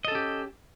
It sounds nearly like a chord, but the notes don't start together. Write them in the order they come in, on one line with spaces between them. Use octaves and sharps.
D#5 A4 C#4 G4